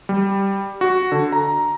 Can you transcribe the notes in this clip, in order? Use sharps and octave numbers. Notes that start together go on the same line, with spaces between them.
G3
F#4
D3
A#5